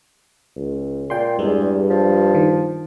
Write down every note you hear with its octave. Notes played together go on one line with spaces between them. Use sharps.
C#2
A#2 G5 C6
E2 G2 G#3
F3
D#3